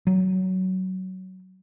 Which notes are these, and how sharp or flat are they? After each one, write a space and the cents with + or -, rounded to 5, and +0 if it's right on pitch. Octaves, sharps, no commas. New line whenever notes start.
F#3 +15